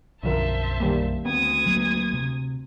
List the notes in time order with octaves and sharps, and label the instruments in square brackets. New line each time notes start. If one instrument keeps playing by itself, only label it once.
[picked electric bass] B1 F#2 [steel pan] D3 F3 A#4 [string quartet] C5 E5 A5
[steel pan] D#3 G3 A#3
[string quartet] D2 D#6 G#6 [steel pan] B3 C4
[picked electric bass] F#3 A#3
C3